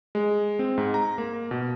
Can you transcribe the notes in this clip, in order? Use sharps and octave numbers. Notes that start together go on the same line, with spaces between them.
G#3
C4
G#2
A#5
A#3
B2